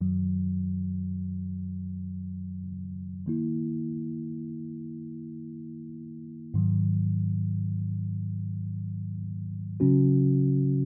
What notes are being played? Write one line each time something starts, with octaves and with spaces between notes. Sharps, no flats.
F#2 D#3 F#3
D#3 A#3 E4
G#2 D#3 F#3
C#3 F#3 C#4 F#4